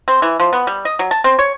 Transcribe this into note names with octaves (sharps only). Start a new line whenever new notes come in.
C4
E3
F3
B3
G3
D#5
F#3
A5
C4
C#5